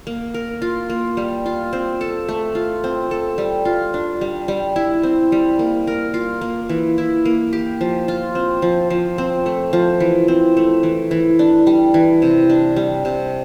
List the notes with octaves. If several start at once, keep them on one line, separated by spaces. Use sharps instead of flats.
A#3
A#4
F4
A#3
G3
F4
C4
A4
A3
F4
C4
A4
G3
F4
D4
G3
G3
E4
C4
G3
A#3
A#4
F4
A#3
E3
E4
A#3
G4
F3
F4
C4
F3
F3
C4
A3
F3
E3
C4
A3
E3
E3
D4
G3
E3
C3
D4
G3
C3